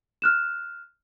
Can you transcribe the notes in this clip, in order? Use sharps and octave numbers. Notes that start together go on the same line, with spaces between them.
F6 F#6 E7